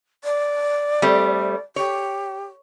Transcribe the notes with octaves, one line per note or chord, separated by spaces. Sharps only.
D5
G3 A3 C4
G4 C#5